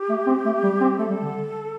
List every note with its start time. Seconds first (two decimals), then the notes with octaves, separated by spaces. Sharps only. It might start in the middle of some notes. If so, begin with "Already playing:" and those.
Already playing: G4
0.09 A3
0.27 C4
0.45 A3
0.63 G3
0.81 C4
0.98 A3 A4
1.10 G3
1.22 D3